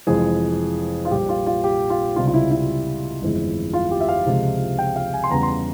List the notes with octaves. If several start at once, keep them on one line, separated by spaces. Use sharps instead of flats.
F1 F2 E3 G#3 G#4
F4
A#1 A#2 G3 G4
F4
F4
G4
F4
C#2 C3 G3 F4
F4
E4
E4
G1 F2 E3 G#3
F4
G4
E5
F5
C#2 C3 F3 G#3
G5
F5
G#5
C6
E2 C#3 G3 A#5
C6
A#5